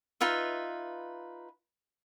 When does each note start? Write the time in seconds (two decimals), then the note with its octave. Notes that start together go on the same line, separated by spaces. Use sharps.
0.21 D#4 F4 B4 E5